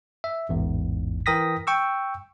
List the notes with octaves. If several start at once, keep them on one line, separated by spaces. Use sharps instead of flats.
E5
A1 E2 G#2
E3 A#4 G5 D#6 A#6 B6
G5 C#6 E6